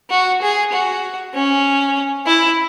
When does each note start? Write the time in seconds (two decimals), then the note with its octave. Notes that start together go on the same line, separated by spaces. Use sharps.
0.10 F#4
0.42 G#4
0.72 F#4
1.34 C#4
2.27 E4